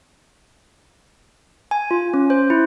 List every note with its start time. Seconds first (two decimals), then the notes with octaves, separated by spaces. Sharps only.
1.71 G#5
1.91 F4
2.14 C#4
2.30 C5
2.50 E4